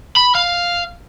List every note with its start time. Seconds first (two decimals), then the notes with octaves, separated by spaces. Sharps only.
0.16 B5
0.35 F5